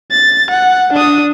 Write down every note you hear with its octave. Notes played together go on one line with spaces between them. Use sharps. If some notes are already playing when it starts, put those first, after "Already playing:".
A6
F#5
D4 D#6